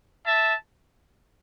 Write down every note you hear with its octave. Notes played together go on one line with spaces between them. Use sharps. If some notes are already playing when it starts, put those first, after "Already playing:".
E5 A5